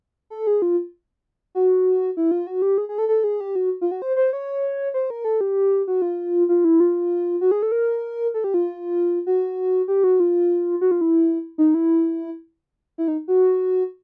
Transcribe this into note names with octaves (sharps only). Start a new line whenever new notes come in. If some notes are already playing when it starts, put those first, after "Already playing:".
A4
G#4
F4
F#4
E4
F4
F#4
G4
G#4
G#4
A4
A4
G#4
G4
F#4
F4
F#4
C5
C5
C#5
C5
A#4
A4
G4
F#4
F4
F4
E4
F4
F#4
G#4
A4
A#4
A4
G4
F4
F#4
G4
F#4
F4
F#4
F4
E4
D#4
E4
E4
D#4
F#4